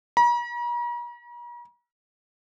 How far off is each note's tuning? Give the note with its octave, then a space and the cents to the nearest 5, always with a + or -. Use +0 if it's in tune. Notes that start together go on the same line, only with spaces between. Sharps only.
A#5 +45